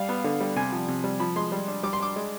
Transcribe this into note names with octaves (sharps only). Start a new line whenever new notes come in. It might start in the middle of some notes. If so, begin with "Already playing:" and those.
Already playing: G3 F5
B3
D3
G3
C3 G#5
F3
C3
G3
F3 B5
G#3 C6
G3
D4
G3 D6
C6
D4 D6
G#3